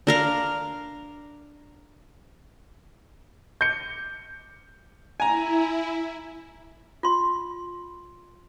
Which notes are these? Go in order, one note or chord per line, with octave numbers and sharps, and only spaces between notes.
D4 A#4 F5
G6 C#7
E4 G#5 A#5
F4 C6